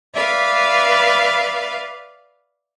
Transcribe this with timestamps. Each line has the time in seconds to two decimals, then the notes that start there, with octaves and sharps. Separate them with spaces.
0.14 B4 D5 E5 F5